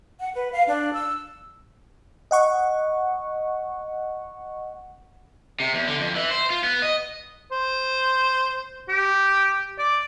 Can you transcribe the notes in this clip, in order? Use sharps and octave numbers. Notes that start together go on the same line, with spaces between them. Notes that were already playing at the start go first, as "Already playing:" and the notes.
F#5
B4
F5
D4
E6
D#5 F#5 C#6
C3
E2
D3
F2
E3
C5
F4
B3
D#5
C5
G4
D5